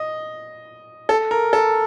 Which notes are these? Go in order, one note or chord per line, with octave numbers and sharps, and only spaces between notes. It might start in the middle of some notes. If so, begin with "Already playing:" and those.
Already playing: D#5
A4
A#4
A4